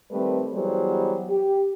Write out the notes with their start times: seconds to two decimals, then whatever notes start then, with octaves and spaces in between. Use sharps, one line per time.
0.11 D#3 G3 A3 C4 B4
0.53 E3 F#3 G3 B3 G#4 C5
1.30 G4